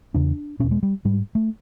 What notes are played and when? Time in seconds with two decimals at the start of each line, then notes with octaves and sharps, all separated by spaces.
0.14 E2 C#3 D4
0.60 E2 B2 C#4
0.71 G#3
0.83 G3
1.05 G#2 G3
1.35 A3